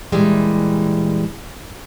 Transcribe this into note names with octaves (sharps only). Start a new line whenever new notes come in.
A#2 E3 G3 G#3